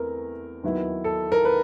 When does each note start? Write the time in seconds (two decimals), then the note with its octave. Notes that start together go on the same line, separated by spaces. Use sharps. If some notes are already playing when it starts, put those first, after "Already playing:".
Already playing: E2 A3 C4 A#4
0.63 D#2 D#3 F#3 B3 E4
1.04 A4
1.32 A#4
1.45 B4